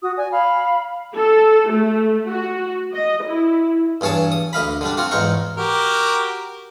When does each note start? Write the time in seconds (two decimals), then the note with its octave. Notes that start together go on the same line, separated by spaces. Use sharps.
0.02 F#4 D#6
0.17 D5 G#5
0.32 F5 B5
1.16 A4
1.70 A3
2.29 F#4
2.94 D#5
3.27 E4
4.01 E2 G2 G#4 C#5 A5
4.32 D#6
4.53 D2 D#5 F5 B5
4.81 D3 G3 D4
4.97 C4 F4 F#4
5.11 E2 G#2 D#4 F5 C#6
5.57 F#4 G4 A#4